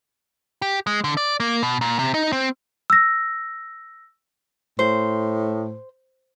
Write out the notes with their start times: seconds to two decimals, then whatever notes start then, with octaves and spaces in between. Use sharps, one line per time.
0.62 G4
0.87 G#3
1.04 D3
1.17 D5
1.40 A#3
1.63 B2
1.81 A#2
1.99 C3
2.14 D#4
2.32 C4
2.90 E6 A#6
4.79 A2 C5